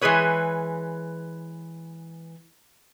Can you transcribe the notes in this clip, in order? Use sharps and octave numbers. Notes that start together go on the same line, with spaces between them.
E3 G#3 G#4 B4 C#5